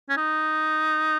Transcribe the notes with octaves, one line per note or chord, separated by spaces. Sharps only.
C#4
D#4